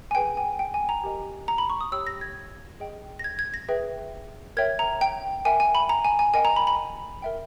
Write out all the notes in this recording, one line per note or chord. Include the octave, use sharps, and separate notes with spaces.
G#5
G#4 B4 G5
G#5
G5
G#5
A#5
G4 A#4 D#5
A#5
B5
C#6
D#6
G4 C#5 G5 E6
A#6
G#6
G#4 D#5 G5
A#6
G#6
G#6
A#6
G#4 B4 E5 G5
A#4 C#5 E5 G5 G#6
A#5
G5
A#4 E5 G5 G#5
G#5
B5
A#5
G#5
G#5
A#4 D#5 G5 G#5
A#5
B5
B5
A#4 E5 G5